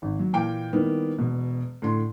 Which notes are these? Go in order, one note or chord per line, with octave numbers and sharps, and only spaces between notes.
G#1
F#3
A#2 E3 F5 G5 D6 D7
D#3 G3 A#3 B3 E4
E1 B2
A2 D3 C6